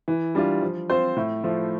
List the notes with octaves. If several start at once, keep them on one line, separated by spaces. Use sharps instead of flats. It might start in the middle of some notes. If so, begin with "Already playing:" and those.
E3
G3 D4 F4
F3
C4 F4 C5
A2
F3 A3